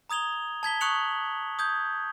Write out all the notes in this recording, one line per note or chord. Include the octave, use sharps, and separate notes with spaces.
A#5 D#6 G#6 F7 G7
A5 G#6 B6 G7
C#6 D#6 F#6 C#7 F7 F#7
D#6 G6 G#6